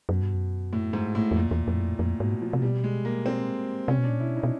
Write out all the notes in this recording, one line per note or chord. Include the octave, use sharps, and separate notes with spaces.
F#2 B2
G2
F#2
A2
G#2
A2
E2
F2 A#2
E2
F2 A2
F#2
F2
F2 A#2
G#2 B2
F3
C3
B2 G3
G#3
A#3
C4
C3 C#4
B2
D4
A#2
B2 E4
D#4
B2